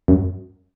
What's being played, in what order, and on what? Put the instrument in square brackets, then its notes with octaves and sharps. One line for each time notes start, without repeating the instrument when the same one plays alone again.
[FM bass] F#2